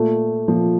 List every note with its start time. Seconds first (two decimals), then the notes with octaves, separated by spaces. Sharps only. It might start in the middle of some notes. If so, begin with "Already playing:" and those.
Already playing: A#2 A3
0.48 A#2 F3